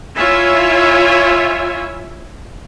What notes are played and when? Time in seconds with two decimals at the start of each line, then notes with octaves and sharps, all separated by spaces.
0.17 E4 F4 C#5 E5 G#5